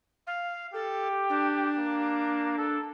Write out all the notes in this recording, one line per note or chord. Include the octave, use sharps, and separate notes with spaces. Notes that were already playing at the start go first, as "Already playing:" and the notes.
F5
G4 A4
D4
A#3
A4